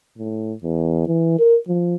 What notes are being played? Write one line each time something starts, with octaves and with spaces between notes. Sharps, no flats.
A2
E2
E3
A#4
F3